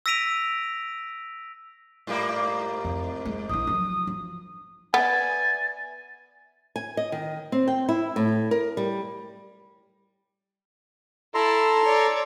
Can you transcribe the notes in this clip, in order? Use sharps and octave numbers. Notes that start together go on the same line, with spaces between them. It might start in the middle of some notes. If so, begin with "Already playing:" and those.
E6 A#6 B6 D7 D#7 F7
G#2 G3 A#3
F2
G#3
A#1 E4 D#6
F3 F#3
F3
B3 B4 D5 E5 G#5 A6
G#5
D#5
D#3
C4
G5
E4
A2
A#4
G3
E4 A4 A5 A#5 C6
C#5 D5